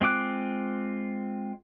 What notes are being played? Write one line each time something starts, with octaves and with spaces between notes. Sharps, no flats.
G#3 C4 F4 D6 F#6